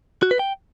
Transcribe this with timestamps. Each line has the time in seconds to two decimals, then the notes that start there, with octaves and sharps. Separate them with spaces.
0.23 F#4
0.31 B4
0.39 G5